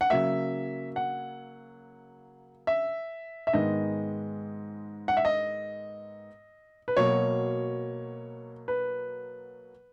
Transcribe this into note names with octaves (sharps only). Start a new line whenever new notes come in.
F#5
C#3 F#3 A#3 E5
F#5
E5
E5
G#2 D#3 G#3 B3 D#5
F#5
E5
D#5
B4
B2 F#3 A#3 C#5
B4